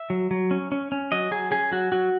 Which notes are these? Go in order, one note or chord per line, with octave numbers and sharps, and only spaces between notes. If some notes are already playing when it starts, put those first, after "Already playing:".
Already playing: E5
F#3
F#3
C#4
C#4
C#4
F#3 D#5
F#3 G#4
C#4 G#4
F#3 F#4
F#3 F#4